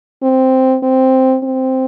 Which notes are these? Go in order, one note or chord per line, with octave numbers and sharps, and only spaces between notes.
C4
C4
C4